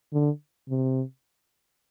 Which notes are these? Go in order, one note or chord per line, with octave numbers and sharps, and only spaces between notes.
D3
C3